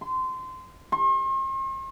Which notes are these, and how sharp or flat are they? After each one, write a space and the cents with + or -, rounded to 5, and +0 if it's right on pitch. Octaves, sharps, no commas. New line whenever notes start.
C6 -20
C6 +45